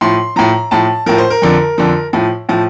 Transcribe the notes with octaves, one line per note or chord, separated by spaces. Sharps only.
A2 F3 C6
A2 F3 A#5
A2 F3 A5
A2 F3 A#4
C5
A#4
F2 D3 F3
F2 D3 F3
A2 F3
A2 F3